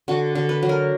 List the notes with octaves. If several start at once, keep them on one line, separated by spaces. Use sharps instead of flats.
D3 F#4
D3
B4
F#3
A#4